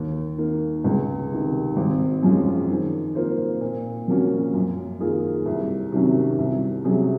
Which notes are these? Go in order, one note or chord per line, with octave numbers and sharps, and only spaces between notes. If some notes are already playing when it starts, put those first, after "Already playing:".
Already playing: D#2
D#3 A#3
C#2
C3 D#3
G#1
F#2 F3 G#3 C#4
D#3
A#3 F4 C5
A#2
F3 A#3 C#4 F#4
F#2
D#3 A#3 F4 G#4
C2
C3 D#3 F#3 C#4
C2
C3 F#3 C#4 G#4